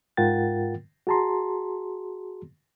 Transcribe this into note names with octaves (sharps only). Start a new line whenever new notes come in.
G#2 F4 A#4 F#5 G5 A6
F#4 G#4 A5 A#5 C6